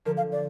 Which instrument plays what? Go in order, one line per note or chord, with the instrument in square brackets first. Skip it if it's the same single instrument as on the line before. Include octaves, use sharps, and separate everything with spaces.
[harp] D3 F3 [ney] A#4
[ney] F5
D5